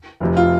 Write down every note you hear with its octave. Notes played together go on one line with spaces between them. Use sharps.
F1 F2 C3
F4